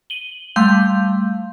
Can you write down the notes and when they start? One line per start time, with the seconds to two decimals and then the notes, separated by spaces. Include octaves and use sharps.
0.10 D#7 F#7 G7
0.56 G3 A3 F5 C6 G6